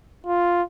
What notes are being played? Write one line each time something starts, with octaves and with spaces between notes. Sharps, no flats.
F4